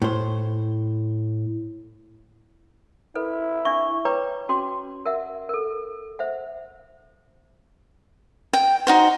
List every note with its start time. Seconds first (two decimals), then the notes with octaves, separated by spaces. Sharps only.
0.02 A2 C5
3.15 E4 A4 B4
3.65 D4 E5 C#6
4.05 B4 C#5 G5 A#5 D6
4.49 C#4 F#4 G5 C6 D6
5.06 A#4 E5 F#5
5.49 A4 A#4
6.19 C5 E5 F#5
8.53 G5
8.87 D#4 F#4 C5